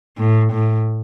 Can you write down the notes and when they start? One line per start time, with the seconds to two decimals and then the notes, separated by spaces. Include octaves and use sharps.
0.18 A2
0.52 A2